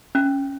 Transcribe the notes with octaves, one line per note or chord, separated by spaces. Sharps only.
C#4